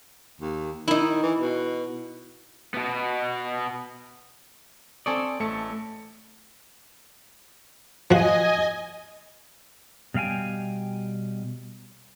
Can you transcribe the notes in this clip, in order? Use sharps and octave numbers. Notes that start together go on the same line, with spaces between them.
D#2
D#3 D#4 E4
E3
B2
B2 B3
C4 A4 D5 G#5 C#6 D#6
A1 A3 A5 C#7
F3 F#4 D#5 G#5
B2 G3 F5 G5 G#5